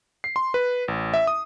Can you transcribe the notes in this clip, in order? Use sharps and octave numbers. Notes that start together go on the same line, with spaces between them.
C7
C6
B4
A1
E5
D#6